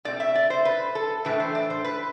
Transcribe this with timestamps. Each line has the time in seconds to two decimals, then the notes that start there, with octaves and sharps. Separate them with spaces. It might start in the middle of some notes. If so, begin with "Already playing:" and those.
0.05 B2 A3 C4 D5
0.20 E5
0.35 D5
0.50 C5
0.65 B4
0.95 A4
1.25 A2 E3 A3 D4 B4
1.40 C5
1.55 D5
1.70 C5
1.84 B4